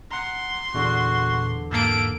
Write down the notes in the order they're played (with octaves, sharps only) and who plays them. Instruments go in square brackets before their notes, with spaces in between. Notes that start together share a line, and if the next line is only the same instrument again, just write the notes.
[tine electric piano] F#5 A#5 [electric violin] C6
[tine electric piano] E2 D3 [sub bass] A#2 [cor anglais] F#4
[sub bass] G#2 [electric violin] A#3 D7 [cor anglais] A4